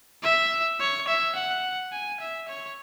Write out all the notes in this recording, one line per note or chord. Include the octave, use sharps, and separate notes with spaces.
E5
C#5
E5
F#5
G#5
E5
C#5